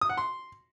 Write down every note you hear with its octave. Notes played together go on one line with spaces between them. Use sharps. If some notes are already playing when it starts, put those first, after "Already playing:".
D#6
F#5
C6